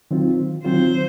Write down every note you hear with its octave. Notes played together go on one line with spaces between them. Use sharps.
D#3 F#3 C4 F4
D#3 F#3 C4 F4 C5